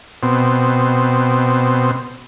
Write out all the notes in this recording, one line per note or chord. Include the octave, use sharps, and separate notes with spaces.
B2 C4